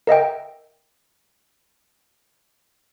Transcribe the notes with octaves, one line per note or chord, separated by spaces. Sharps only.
A#4 D#5 E5 G5